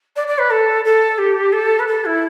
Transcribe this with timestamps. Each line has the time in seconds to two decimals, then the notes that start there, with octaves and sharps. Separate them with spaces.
0.16 D5
0.27 D5
0.38 B4
0.50 A4
0.84 A4
1.18 G4
1.52 A4
1.79 B4
1.87 A4
2.05 E4